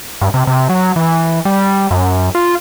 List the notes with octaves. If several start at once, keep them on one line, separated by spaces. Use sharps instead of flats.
G2
C3
C3
F#3
E3
G3
F#2
F4